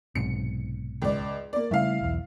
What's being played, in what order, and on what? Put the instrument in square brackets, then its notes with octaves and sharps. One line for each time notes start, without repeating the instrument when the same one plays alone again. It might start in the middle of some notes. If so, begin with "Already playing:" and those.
[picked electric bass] B1 G#2 C3 [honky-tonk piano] C#7
[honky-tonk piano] C#2 D5
A#3 D5
[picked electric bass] C#3 G3 A3 [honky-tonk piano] E4 F5
[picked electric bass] B1 E2